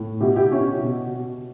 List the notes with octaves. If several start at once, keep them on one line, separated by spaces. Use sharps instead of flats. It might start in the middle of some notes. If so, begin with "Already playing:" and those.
Already playing: A2
B2 E4 G4
E4 G4
B2 C#4 E4
B2
B2